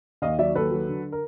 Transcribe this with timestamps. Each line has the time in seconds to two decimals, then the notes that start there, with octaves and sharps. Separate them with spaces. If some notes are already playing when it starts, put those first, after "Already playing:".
0.22 D#2 D#5 F5
0.39 F#3 D5 E5
0.55 D#2 A4 B4
0.72 F#3
0.88 D3
1.12 A#4